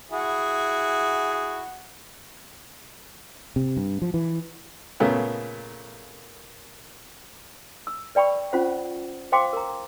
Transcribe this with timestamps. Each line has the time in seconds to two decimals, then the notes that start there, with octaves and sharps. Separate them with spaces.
0.12 E4 F#4 G#4
3.56 C3
3.77 G2
4.02 F3
4.14 E3
5.00 A#2 C#3 A3 B3
7.87 E6
8.15 B4 D5 G5 B5 C#6
8.52 C#4 F4 C5 F#5
9.32 C5 F5 G5 C6 D6
9.53 A#4 A#5